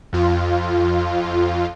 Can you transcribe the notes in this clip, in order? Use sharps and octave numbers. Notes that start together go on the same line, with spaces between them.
F2 F4